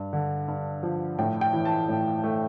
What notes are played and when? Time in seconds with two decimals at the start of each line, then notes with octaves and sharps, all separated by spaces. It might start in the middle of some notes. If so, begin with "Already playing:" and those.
Already playing: G2
0.13 D3
0.48 G2
0.83 F3
1.19 A2 G5
1.41 G5
1.53 E3
1.65 A5
1.89 A2
2.24 A3